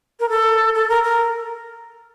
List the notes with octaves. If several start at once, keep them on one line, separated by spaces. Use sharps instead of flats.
A#4
A4
A4
A#4
A#4